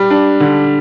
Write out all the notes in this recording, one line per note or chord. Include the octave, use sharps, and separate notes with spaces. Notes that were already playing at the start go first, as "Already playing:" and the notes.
Already playing: G3
D4
D3